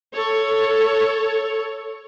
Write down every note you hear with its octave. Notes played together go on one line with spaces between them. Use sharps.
A4 C#5